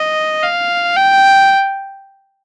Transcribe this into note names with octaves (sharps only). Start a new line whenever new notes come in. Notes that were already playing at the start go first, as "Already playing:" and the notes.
Already playing: D#5
F5
G5